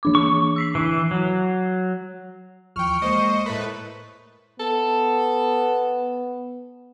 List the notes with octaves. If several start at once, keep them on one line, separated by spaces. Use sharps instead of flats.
E3 D4 D6
C#6
E6 B6 C7
E3 C7
F#3
D#2 E3 F3 G5 C#6 F6
G#3 A#3 C5 D#5 C#7
A2 A3 A#4 B4
B3 A4